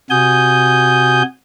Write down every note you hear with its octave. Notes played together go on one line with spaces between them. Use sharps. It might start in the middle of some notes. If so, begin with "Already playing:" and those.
C3 F#4 G#5 D#6 G6